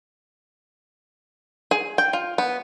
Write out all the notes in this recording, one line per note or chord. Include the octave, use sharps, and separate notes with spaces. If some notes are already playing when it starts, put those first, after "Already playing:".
G#4
G5
F4
B3